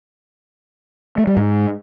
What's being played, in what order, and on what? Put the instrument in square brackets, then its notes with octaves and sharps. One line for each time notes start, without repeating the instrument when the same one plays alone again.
[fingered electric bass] A3
G3
G#2